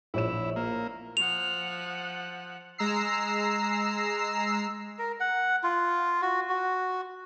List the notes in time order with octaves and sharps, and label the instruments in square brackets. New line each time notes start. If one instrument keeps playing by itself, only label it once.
[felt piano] A#1 C#5 E7 [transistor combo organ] E4
[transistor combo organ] A#3
[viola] F3 F#5 [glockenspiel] F7
[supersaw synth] G#3 A#5 E6 C7
[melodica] A#4
F#5
F4
F#4
F#4